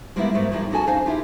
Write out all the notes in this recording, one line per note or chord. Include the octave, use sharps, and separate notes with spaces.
G3 G#3 A#3 B3 D4 E4
G#2 G3 A3 A#3
E3 F3 G3 A#3 D#4 G4
C#4 D#4 F#4 A4 G#5 A5
F2 D4 D#4 C5 F5 G#5
E4 F4 G4